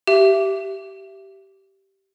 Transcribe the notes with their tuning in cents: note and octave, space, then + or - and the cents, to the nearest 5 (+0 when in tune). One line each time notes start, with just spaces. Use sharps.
G4 -15 E5 +20